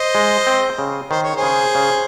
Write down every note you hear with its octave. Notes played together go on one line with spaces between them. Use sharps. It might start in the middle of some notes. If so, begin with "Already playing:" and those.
Already playing: C5 D#5
G#3
C4
C#3
D#3 C5
C#5
G#4 C5
C#3
C#3